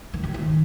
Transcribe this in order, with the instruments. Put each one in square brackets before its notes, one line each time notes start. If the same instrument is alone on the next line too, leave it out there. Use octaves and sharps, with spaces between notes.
[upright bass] D#3
D3
D#3